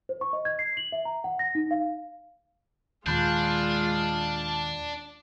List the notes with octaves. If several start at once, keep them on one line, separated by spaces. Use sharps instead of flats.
C5
C#6
D#5
G#6
C7
F#7
E5
A#5
F#5
A#6
D#4
F5
D#2 A#2 G#3 D4 F4 B5 F#6 G6